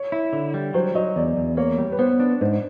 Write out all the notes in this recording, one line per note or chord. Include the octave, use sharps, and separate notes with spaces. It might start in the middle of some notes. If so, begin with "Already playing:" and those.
Already playing: C#5
E4
D3
G3
F#3 C5
F#3 D#5
E2 D5
E2
A#3 C#5
G3
B4
B3 C5
D4
G#2 C5